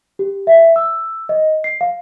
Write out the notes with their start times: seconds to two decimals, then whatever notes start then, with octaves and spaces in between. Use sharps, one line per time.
0.19 G4
0.47 E5
0.76 E6
1.29 D#5
1.64 C7
1.81 F5